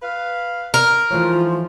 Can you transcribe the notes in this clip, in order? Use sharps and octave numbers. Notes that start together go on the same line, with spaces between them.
B4 F5
A#4
G#2 E3 F3 A3 F4 C#5